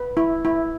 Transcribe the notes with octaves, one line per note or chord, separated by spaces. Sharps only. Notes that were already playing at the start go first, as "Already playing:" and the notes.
Already playing: B4
E4
E4